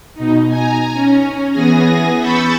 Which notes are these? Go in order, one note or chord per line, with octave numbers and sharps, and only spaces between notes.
B2 D#4
G#5 A#5
C#4
E3 B3 G#4 G#5 A#6
B5 C#6 E6 G6 A6 C#7